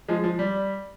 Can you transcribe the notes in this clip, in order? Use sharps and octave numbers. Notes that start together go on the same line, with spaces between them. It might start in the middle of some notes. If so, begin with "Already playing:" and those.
F3 G#3
F3
G3